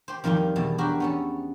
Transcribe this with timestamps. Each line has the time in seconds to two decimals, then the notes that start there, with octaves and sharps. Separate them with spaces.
0.08 G4 C5
0.24 F2 D#3 G3 F4 G4
0.56 E2 B2 A5
0.78 D4 F#4 G4 A#4
1.00 B3 C#4 A4